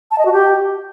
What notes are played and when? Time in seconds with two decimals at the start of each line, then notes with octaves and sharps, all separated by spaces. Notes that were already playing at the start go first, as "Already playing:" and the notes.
0.11 A5
0.18 D#5
0.26 F#4
0.33 G4